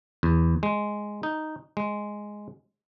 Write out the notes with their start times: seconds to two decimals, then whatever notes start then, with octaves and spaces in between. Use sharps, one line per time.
0.23 E2
0.63 G#3
1.23 D#4
1.77 G#3